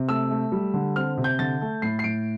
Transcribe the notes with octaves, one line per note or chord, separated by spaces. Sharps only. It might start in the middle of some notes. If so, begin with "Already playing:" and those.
Already playing: C3
A3 E6
A3
G3
D3
C4 F6
C3
G6
D3 A6
A3
A2 C7
C7
A2 D7